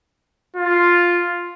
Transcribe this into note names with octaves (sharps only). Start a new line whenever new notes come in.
F4